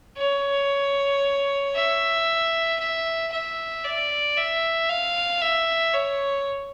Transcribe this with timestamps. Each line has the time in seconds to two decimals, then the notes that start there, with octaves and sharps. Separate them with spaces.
0.18 C#5
1.75 E5
2.80 E5
3.32 E5
3.85 D5
4.37 E5
4.89 F5
5.41 E5
5.93 C#5